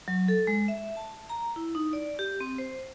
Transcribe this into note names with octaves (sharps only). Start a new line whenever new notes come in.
F#3
A4
G#3
E5
A5
A#5
E4
D#4
D5
G4
C4
C5